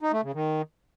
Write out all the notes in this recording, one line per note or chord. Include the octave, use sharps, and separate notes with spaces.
D#4
A3
C#3
D#3